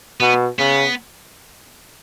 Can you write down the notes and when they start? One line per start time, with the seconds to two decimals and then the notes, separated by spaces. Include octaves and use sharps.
0.20 B2 B3
0.59 C#3 B3